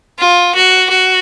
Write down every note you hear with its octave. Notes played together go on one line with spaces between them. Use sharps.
F4
F#4
F#4